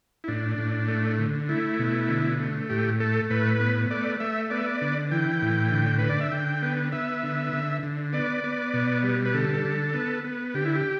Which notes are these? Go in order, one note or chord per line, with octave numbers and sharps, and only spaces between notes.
E4
A2 D4
A2
A3
D3
A3 E4
B2
D3
A3
A2 G4
A3 A4
A2 B4
B3
A3 D5
A3 E5
B3 D5
E5
D5
D3
E3 G5
A2
D3
D3 B4
D5
E5
D3 G5
B3
B3 E5
D3
D3
D3
B3 D5
B3
B2
G3
B4
D3 A4
D3
B3
B3
D3 G4
E4
G4